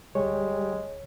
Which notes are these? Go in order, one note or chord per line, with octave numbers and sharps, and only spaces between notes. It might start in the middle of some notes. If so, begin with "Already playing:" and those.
D2 G3 G#3 C#5